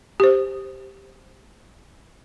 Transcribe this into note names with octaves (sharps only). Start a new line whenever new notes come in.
G4 C5